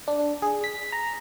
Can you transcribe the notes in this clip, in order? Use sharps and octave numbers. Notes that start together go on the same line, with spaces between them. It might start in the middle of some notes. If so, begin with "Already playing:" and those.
D4
G#4
B6
A#5